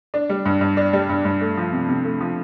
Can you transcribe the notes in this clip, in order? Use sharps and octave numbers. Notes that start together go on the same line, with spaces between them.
D4
G3
G2
G2
D4
G3
G2
G2
A3
F3
C3
C3
A3
F3